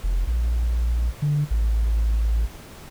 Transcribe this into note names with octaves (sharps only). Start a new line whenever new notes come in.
F1
A#1
D3
A1